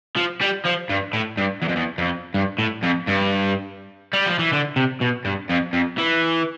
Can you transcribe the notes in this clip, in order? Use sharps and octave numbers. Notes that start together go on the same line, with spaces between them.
F3
G3
F3
G2
A2
G2
E2
F2
E2
F2
G2
A2
F2
G2
G3
F3
E3
D3
C3
B2
G2
F2
F2
E3